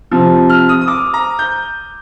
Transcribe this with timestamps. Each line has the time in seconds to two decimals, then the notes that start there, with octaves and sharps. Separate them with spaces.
0.11 C3 F3
0.50 F6
0.69 D#6
0.81 D#6
0.88 D6
1.14 A#5
1.39 G6